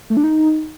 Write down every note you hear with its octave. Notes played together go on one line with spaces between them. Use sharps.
A3
D4
D#4